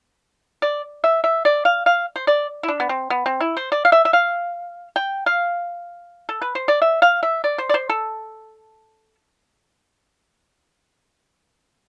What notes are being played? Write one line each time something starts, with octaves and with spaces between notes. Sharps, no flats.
D5
E5
E5
D5
F5
F5
C5
D5
E4
D4
B3
C4
B3
C4
E4
C5
D5
F5
E5
E5
F5
G5
F5
A4
B4
C5
D5
E5
F5
E5
D5
C5
D5
C5
A4